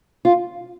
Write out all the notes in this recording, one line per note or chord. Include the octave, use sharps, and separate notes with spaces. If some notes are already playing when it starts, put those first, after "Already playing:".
F4